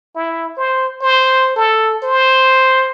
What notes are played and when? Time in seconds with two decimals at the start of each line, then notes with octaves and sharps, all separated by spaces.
0.16 E4
0.57 C5
1.02 C5
1.56 A4
2.03 C5